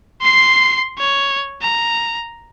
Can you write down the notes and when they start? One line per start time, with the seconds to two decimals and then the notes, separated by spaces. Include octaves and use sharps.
0.21 C6 C7
0.98 C#5
1.61 A#5